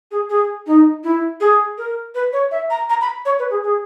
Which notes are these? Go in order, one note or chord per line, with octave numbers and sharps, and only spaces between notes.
G#4
G#4
D#4
E4
G#4
A#4
B4
C#5
E5
A#5
A#5
B5
C#5
B4
G#4
G#4